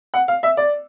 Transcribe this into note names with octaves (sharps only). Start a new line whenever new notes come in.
F#5
F5
E5
D5